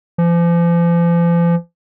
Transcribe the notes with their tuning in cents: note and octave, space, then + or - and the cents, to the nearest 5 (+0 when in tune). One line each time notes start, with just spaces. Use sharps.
F3 -40